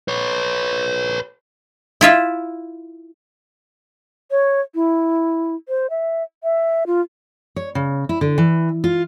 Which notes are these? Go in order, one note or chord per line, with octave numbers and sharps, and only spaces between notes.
B4 C#5
E4 F4 E5
C#5
E4
C5
E5
E5
F4
C#5
C#3
E4
D3
E3
F4